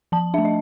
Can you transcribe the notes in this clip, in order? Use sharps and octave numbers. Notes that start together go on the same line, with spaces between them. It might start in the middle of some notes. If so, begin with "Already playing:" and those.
F3 A5
A3 D4 E5
D#5